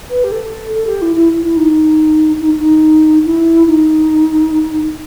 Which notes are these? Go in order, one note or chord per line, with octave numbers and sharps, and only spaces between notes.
B4
G4
A4
A4
G4
E4
E4
E4
D#4
D#4
D#4
E4
D#4